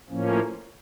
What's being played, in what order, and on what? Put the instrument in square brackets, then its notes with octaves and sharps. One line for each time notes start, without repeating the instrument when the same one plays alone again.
[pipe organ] A2 F3 A#3 C#4